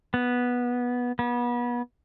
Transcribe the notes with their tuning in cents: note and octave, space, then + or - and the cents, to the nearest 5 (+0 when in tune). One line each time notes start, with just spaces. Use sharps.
B3 -10
B3 -30